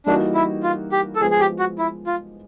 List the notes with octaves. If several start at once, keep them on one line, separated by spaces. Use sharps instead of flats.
E3 G3 A#3 D4 D#4 F#4
E4
F4
G4
A4
F3 G#3 B3 G#4
G#4
G4
F#4
E4
F4